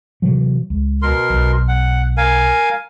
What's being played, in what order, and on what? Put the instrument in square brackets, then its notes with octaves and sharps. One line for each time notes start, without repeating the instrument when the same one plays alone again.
[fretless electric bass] C3 E3 F#3
C#2
[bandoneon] B2 A#4 C6
[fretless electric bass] B1
[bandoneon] F#5
A#4 F5 G#5